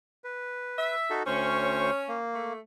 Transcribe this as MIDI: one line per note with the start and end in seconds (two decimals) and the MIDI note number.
0.24 0.95 71
0.78 1.18 76
1.10 1.23 63
1.10 1.23 66
1.10 1.23 69
1.27 1.91 38
1.27 2.22 61
1.27 1.91 72
1.27 1.91 85
2.08 2.53 58
2.33 2.59 57